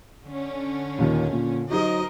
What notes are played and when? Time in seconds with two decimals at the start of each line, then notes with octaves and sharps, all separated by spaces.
0.24 D3 C#4
0.98 D#2 A#2 D#3
1.32 A#2
1.70 F#3 D#4 F#4 A#4 C5 D#5